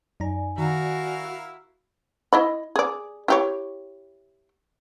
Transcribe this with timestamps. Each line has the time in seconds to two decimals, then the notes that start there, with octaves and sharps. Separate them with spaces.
0.20 F#2 D#4 D5 G#5 A#5
0.58 D#3 E4 F#4 A#4 F5
2.33 E4 D#5 B5
2.76 G#4 D5
3.28 E4 G4 C#5